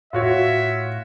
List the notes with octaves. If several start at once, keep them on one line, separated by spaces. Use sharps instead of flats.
A2 F4 F#4 C#5 E5